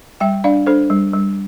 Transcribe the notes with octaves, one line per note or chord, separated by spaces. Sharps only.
G3 E5 G5
D4 D5 F5
D4 A4 C5
G3
G3